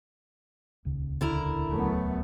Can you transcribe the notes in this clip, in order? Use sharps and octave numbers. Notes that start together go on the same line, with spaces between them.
D#1 C#2 C#3
D3 E4 A#4
F#2 A3 B3